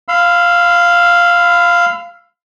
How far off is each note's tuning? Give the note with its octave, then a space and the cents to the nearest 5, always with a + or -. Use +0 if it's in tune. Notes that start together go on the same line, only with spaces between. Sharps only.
F5 +0 B5 +45 E6 +20